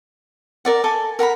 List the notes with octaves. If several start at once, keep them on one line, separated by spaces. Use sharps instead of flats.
A#4 D5 F#5
A4 G#5 D6
A#4 F#5 A#5 B5